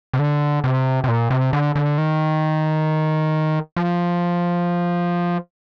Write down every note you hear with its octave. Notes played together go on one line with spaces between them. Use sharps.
C3
D3
C3
C3
A#2
C3
D3
D3
D#3
F3